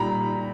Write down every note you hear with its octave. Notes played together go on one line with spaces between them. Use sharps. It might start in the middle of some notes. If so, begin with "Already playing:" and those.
Already playing: A#2 G3 A#5 B5